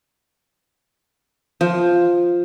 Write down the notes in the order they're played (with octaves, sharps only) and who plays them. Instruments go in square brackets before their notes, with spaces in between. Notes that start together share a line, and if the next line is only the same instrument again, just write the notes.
[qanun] F3